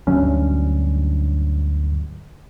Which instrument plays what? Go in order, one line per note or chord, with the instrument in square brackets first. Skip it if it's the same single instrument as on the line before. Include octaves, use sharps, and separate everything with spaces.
[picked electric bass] D2 G2 F#3 C#4